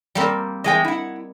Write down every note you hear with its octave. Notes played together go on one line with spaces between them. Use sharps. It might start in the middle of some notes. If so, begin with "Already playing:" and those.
G3 A#3 C4
E2 G#3 D#5 G5
E4 F#5